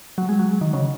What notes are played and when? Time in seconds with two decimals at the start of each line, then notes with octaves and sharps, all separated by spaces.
0.18 F#3
0.29 G#3
0.39 F#3
0.61 D#3
0.73 C#3